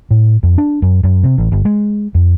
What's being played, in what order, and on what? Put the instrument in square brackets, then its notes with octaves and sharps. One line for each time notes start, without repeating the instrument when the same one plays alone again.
[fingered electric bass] A2
F2
D4
F#2
F#2
C3
A1
G1
G#3
F2